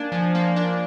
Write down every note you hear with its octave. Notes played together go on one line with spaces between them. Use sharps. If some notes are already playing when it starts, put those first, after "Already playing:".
Already playing: A#3 D4 G#5
F3
A#3
D4